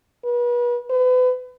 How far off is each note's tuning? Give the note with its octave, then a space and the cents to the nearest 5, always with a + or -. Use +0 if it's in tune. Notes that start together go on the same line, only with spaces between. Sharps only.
B4 -35
B4 +35